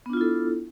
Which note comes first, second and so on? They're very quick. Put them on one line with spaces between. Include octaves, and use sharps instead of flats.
B3 D4 F4 E4 A4